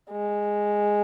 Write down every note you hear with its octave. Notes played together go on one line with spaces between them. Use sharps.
G#3